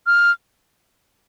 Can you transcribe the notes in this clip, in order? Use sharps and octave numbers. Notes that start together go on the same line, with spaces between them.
F6